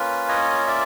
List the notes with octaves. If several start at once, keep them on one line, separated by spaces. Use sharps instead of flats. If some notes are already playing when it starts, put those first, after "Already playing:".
Already playing: A#3 C#4 F4 B4
C#5 D#5
D5 E5